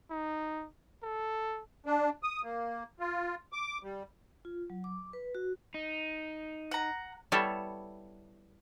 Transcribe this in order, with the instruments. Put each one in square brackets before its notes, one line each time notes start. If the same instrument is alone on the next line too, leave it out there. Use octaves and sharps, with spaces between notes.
[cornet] D#4
A4
[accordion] D4
D#6
A#3
F4
D6
G3
[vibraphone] F4
F#3
D6
B4
F#4
[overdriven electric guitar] D#4
[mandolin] F#5 A#5
[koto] G3 B3 E4 A4 C#5